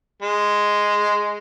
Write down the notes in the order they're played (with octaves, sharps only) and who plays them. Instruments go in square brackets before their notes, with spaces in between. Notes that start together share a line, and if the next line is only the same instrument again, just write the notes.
[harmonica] G#3